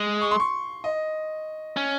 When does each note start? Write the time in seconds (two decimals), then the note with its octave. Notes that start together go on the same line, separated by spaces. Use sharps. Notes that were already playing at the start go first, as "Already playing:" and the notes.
Already playing: G#3
0.22 C#6
0.31 C6
0.40 C#6
0.84 D#5
1.77 C#4